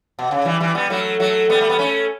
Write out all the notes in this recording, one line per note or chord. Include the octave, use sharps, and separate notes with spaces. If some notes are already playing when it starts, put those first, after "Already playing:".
B2
C#3
E3 G3
E3 G3
G3 B3
F#3 A3
F#3 A3
G3 B3
A3
B3
A3 C#4